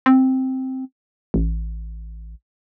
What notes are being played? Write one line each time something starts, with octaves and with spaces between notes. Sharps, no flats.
C4
A1